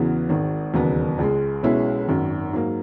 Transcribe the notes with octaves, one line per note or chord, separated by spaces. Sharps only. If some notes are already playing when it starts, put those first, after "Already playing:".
Already playing: E2 C#3 E3 B3 F#4
G#1 G#2 D#3
E1 D#2 C#3 F#3 B3
C#2 C#3 G#3
B1 B2 G#3 C#4 E4
G#1 F#2 D#3
G#2 F#3 A#3